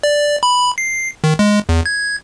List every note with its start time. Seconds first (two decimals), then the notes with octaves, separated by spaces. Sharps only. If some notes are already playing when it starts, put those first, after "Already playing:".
0.03 D5
0.43 B5
0.78 C7
1.24 D#3
1.39 G#3
1.69 E2
1.86 G#6